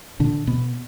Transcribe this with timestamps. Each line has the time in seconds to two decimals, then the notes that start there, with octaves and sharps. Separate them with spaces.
0.20 A#2 D3 D4
0.47 B2 B3